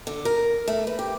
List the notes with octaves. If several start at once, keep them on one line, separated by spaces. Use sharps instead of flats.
D3
A#4
A3
B4
G4